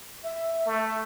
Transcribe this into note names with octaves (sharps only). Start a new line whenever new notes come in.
E5
A3